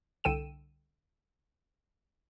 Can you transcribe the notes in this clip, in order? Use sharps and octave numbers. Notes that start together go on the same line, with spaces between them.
C2 D3 A4 G5 D#7 E7